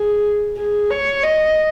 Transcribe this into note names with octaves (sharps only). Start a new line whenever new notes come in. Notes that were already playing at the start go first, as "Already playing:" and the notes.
Already playing: G#4
G#4
C#5
D#5